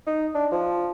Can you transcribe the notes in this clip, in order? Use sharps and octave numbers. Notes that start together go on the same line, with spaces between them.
D#4
D4
F3